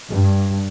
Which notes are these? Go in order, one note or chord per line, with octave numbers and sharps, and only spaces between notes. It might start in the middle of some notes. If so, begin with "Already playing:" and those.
G2